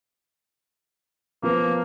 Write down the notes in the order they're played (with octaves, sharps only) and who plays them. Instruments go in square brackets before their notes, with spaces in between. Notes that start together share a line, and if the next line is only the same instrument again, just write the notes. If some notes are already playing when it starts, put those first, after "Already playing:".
[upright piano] F3 B3 [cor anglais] A#3